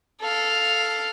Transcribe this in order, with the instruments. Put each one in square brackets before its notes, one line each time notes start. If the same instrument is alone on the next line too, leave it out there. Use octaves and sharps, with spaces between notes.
[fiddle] A4 F5